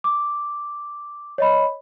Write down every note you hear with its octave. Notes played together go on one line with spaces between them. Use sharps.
D6
C#5 D#5 B5